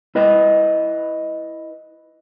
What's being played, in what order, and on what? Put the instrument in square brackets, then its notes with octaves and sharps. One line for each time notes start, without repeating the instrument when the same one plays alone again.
[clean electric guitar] E4 B4 D#5